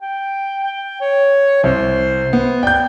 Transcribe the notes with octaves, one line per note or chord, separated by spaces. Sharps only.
G5
G5
C#5
C2 C5
B3
D5 G5 G6